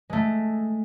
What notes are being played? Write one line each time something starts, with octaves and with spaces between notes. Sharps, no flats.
G#3 A3